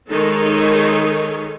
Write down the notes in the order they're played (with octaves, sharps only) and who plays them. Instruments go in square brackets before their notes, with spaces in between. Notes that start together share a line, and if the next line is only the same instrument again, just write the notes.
[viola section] D#3 G#3 D#4 G#4 A4 C#5